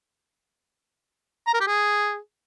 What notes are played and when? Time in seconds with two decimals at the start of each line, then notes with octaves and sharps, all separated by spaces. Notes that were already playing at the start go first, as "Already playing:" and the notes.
1.47 A#5
1.54 A#4
1.61 G4
1.68 G#4